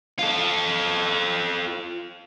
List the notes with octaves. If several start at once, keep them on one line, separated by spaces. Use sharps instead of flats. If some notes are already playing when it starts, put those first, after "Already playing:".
F4 A4